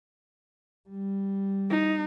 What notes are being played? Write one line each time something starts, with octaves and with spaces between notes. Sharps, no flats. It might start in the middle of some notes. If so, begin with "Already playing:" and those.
G3
D#4